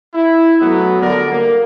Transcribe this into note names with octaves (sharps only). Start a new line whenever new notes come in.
E4
F#3 A3 B3
D3 F#3 G3 A#4 D5
A#3